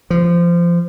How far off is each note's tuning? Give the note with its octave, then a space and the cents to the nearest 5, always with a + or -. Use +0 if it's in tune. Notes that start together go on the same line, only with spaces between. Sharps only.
F3 -20